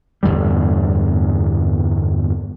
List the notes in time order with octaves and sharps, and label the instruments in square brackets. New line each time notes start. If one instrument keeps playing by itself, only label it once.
[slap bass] G1 E2 A2 G3